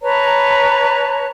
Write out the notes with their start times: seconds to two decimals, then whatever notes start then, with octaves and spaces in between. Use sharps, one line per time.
0.02 B4 C#5 A5 A#5